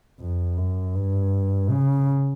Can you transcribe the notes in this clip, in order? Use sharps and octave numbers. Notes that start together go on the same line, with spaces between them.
F2
F#2
G2
C#3